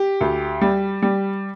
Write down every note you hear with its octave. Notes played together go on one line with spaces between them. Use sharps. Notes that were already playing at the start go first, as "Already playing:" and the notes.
Already playing: G4
D2
G3
G3